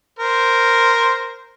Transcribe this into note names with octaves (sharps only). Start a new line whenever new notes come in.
A#4 C5